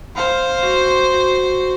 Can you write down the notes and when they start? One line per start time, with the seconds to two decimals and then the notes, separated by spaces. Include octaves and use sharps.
0.16 C5 F5
0.63 F#4
1.11 F#4